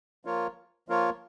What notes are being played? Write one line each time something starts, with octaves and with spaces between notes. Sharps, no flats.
F3 A#3 F4 A#4 C#5
F3 A#3 F4 A#4 C#5